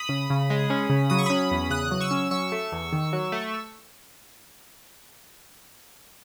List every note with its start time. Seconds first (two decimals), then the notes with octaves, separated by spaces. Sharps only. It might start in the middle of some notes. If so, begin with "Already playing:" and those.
Already playing: B5 D#6
0.09 C#3
0.30 C#3
0.50 G#3
0.70 C#4
0.89 C#3
1.10 F#3 D#6
1.19 C#6
1.26 C#4 B5 D#6
1.51 E2
1.70 C#3 D#6 F#6
1.91 F#3
2.01 C#6 E6
2.11 C#4
2.31 F#3 C#6 E6
2.52 A3
2.72 E2
2.93 D#3
3.13 F#3
3.32 A3